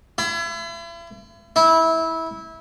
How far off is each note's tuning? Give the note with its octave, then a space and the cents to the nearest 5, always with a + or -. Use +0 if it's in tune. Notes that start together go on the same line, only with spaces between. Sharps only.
E4 +40
E4 -20